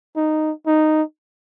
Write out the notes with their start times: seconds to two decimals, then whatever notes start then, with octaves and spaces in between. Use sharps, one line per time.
0.16 D#4
0.67 D#4